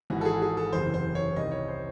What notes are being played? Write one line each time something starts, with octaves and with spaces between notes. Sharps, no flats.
G#1 G#2 E3 F#4
A4
G#4
G#4
A4
F#1 E2 C3 C5
C5
C#5
C2 C3 D#3 D#5
C#5
C5